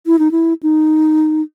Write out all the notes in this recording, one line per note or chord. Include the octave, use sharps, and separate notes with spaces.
E4
D#4
E4
D#4